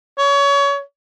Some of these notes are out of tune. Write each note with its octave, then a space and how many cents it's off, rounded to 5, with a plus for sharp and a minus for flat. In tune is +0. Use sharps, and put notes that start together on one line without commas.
C#5 +25